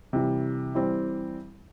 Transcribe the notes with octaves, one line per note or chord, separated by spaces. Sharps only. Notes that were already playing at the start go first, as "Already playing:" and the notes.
C3 E3 G3
E3 G3 C4